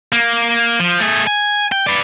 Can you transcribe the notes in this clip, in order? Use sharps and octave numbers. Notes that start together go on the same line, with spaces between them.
A#3
F3
A3 G#4
G#5
G5
B4 D5